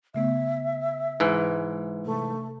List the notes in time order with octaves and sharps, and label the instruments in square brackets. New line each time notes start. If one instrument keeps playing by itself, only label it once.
[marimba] C#3 A3 B3 [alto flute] E5
[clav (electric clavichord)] G#2 E3
[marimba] C3 [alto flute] A3